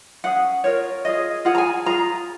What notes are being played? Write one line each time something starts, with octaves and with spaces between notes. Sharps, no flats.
C#4 G#4 F#5
F4 A#4 C#5
F4 G#4 D#5
F4 G#4 F#5
A#5
G#5
F4 G#4 A#5